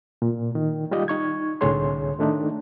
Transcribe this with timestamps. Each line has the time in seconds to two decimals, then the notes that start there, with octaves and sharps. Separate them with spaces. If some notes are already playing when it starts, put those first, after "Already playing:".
0.22 A#2
0.55 D#3
0.91 G3 F4 G4 D5 D#5
1.08 D#4 C#6 G#6
1.61 C2 A2 D3 G#4 C#5 C6
2.19 D#3 A3 D4 D#4